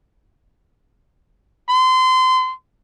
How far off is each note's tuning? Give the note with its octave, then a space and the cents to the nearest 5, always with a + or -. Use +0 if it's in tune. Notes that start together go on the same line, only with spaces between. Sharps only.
C6 -25